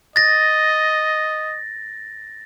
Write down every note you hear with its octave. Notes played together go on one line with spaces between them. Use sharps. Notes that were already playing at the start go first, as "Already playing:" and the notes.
D#5 A6 A#6